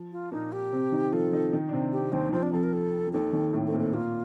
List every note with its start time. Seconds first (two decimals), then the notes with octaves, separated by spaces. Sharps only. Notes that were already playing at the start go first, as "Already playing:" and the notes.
Already playing: F3
0.12 F4
0.32 A#2 A#3 D#4
0.52 G4
0.72 C3 C4
0.92 D#3 D#4
1.12 F3 F4 A4
1.32 D#3 D#4
1.52 D#3 D#4
1.69 D4
1.73 C3 C4
1.93 G4
2.12 D#2 D#3 C4
2.29 D#3
2.33 F2 F3 C4
2.43 D4
2.52 F2 F3 A4
2.63 A#4
2.73 A4
3.07 F3
3.13 D#2 D#3 A4
3.33 D#2 D#3
3.53 A2 A3
3.67 C4 A4
3.73 A#2 A#3
3.79 A4
3.93 A#2 A#3 F4